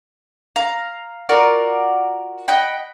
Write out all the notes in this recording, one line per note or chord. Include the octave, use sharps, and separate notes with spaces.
F5 A#5
F4 F#4 A#4 D5
D#5 F#5 G5 B5